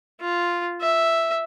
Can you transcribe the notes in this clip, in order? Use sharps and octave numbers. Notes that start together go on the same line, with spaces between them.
F4
E5